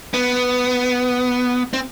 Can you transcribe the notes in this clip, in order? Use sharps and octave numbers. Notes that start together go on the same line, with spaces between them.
B3
C4